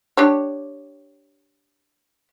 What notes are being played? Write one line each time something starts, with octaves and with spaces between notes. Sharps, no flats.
D4 G4 C#5